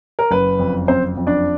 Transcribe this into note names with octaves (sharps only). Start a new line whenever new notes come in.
A#4
F#1 B4
F2
F#1 C4 C5
F2
D4 D5